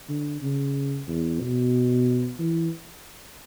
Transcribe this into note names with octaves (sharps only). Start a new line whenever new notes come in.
D3
C#3
E2
B2
E3